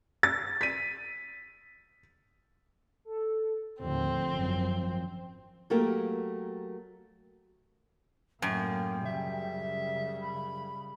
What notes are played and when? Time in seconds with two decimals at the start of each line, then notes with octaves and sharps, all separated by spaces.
0.23 A6
0.61 B6 D#7
3.05 A4
3.80 D#2 A2 D3 F3 C4
4.28 G#1 F#2
5.70 F#3 A3 A#3 G4 A4 A#4
8.42 F#2 A2 A#3 G5
9.05 C#3 G3 E5
10.22 B5